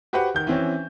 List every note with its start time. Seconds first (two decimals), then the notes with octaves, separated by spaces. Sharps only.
0.13 F#4 G4 B4 C5 F#5
0.34 D#3 G6
0.47 E3 C4 C#4